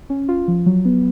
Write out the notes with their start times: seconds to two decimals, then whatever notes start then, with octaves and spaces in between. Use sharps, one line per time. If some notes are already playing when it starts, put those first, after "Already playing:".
0.10 C#4
0.28 F4
0.48 F3
0.66 F#3
0.85 B3